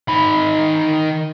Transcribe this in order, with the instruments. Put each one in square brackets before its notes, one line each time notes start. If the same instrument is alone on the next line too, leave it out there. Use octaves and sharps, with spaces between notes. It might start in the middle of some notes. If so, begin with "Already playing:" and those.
[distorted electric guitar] D#3 B5